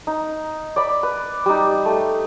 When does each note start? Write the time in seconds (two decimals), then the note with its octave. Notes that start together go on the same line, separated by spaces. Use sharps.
0.07 D#4
0.76 D5 B5
1.03 B4
1.46 G3 D#4
1.86 A3